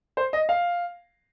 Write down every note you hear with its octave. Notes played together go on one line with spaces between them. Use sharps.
C5
D#5
F5